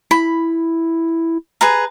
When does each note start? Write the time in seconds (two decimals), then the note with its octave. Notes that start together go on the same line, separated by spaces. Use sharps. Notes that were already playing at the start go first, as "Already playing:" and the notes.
0.11 E4 B5
1.61 G#4 B4 A#5